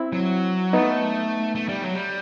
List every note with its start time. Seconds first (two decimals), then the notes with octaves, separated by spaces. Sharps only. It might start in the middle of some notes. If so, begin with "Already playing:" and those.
Already playing: C4 E4
0.13 F#3
0.73 A3 B3 D#4
1.55 A3
1.68 G3
1.82 F#3
1.95 G3